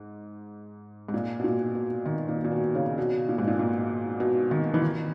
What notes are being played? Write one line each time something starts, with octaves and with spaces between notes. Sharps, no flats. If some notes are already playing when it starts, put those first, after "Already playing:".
Already playing: G#2
G#2
A#2
B2
A#2
B2
D#3
A#2
A#2
B2
C#3
B2
A#2
G#2
A#2
A#2
B2
D#3
E3
D#3